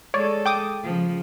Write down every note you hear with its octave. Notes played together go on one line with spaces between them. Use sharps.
G#3 A4 C#5 D5
G5 D6 D#6
C#3 F3